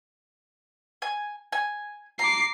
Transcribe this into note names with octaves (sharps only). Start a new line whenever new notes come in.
G#5
G#5
A#5 D6 C7